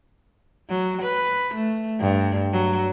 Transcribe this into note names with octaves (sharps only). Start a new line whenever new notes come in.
F#3
B4
A3
G2
F#3